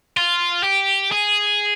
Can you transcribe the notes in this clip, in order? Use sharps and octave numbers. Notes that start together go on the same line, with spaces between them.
F4
G4
G#4